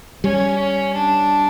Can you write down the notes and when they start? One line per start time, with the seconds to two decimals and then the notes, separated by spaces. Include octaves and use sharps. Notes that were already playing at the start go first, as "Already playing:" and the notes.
0.24 G3 C#4
0.95 D4